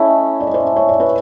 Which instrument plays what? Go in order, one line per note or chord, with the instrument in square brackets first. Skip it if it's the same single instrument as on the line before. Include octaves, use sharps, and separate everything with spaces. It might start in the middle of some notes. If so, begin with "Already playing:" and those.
Already playing: [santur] A3 C#4 E4 [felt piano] C#5 D#5
[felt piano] D5
D#5
C5 D5
C#5
D5
B4 C#5